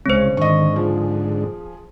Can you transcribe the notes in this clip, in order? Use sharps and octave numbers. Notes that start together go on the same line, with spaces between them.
C2 C#3 G#3 C4 C5 C#5
G#2 D3 D#3 D#5 C#6
F3 G#4